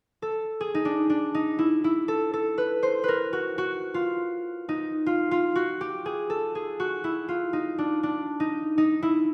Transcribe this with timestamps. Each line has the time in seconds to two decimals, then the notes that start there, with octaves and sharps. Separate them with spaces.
0.22 A4
0.60 G#4
0.74 D#4
0.85 D4
1.10 D4
1.34 D#4
1.59 E4
1.84 E4
2.08 A4
2.33 A4
2.58 B4
2.83 C5
3.04 A#4 B4
3.33 F#4
3.58 F#4
3.94 F4
4.69 D#4
5.06 F4
5.31 F4
5.55 F#4
5.81 G4
6.05 G#4
6.30 A4
6.55 G#4
6.80 F#4
7.04 E4
7.28 F4
7.53 D#4
7.78 D4
8.03 D4
8.40 D#4
8.78 D#4
9.02 E4